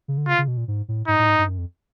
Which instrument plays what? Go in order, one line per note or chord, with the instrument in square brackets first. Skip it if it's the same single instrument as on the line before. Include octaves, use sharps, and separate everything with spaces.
[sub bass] C#3
D3
[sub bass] C#3 [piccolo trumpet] F4
[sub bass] C#3
B2
A#2
G#2
A2
[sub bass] G#2 [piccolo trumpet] D#4
[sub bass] A2
G#2
G2
F#2
F2